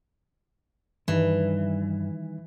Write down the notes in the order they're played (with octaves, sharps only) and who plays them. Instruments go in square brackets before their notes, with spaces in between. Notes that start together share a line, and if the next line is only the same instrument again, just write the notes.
[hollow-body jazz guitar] G2 [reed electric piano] D#3 G3 D#4 [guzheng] E3